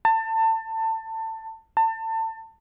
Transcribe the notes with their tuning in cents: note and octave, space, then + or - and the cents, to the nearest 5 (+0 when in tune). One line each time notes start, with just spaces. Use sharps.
A5 +25
A5 +30